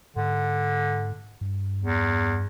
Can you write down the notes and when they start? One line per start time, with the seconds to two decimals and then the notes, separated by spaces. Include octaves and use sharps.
0.16 G#2 D3
1.41 G2
1.82 E2